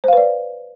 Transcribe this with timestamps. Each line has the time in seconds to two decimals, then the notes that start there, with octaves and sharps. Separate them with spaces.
0.04 C5
0.08 F5
0.13 B4
0.17 D5